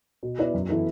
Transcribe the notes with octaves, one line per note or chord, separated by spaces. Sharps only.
B2
B3 E4 D5
F#2
E3 B3 E4 A4